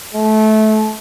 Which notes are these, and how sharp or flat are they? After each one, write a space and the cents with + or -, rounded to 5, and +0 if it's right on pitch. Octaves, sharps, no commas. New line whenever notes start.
A3 -25